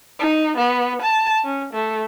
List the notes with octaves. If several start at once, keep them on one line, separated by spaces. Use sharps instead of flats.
D#4
B3
A5
C#4
A3